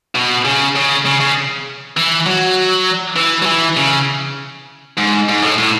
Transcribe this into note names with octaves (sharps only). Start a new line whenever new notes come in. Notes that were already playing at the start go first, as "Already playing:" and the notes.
B2
C#3
C#3
C#3
C#3
E3
F#3
E3
F#3
E3
C#3
G#2
G#2
A2
A2